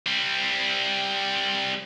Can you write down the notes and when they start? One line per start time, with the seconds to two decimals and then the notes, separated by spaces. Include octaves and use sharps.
0.06 G3 C4